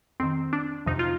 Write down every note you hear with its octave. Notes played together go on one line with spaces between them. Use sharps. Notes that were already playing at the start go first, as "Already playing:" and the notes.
F2 D#3 C4
D4
F2 C3 F3 D#4
F4